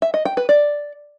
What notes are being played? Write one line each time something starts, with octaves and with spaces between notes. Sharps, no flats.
E5
D#5
G5
B4
D5